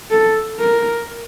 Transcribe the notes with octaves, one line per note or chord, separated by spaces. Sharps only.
A4
A#4